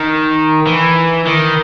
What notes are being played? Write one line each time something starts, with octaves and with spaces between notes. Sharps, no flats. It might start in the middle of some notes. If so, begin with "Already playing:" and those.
Already playing: D#3
E3
D#3